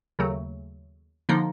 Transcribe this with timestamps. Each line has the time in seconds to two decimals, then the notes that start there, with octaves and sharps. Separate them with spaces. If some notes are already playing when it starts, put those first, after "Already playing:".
0.19 D#2 C#3 F#3 A3
1.29 D3 F3 A#3 D#4